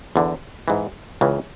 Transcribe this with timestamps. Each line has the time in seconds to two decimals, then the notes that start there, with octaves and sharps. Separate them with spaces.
0.16 E2 D3
0.68 G#2 E3
1.21 C#2 C#3 E3